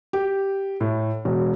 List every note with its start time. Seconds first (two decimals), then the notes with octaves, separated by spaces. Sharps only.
0.13 G4
0.81 A2
1.25 E1